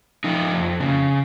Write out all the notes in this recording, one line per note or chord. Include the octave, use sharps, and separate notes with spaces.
F3 D#4
F2
C#3